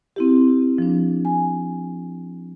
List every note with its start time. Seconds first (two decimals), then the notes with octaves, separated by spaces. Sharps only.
0.16 C4 E4 G4
0.78 F3 D4
1.25 G#5